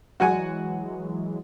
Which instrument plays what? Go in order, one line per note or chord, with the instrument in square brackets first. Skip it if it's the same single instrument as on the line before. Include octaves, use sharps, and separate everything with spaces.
[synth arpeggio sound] E3 F#3 G#3 [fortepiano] F#4 F#5 G#5